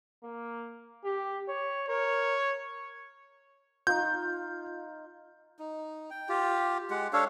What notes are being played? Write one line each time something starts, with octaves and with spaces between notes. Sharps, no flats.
A#3
G4
C#5
A#4 C#5
D#4 F4 G6
D#4
G5
F4 G4
G#3 G4 F#5
D4 A4 C#5 F5